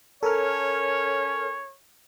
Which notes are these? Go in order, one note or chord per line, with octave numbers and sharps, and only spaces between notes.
C#4 A4 A#4 C#5 F6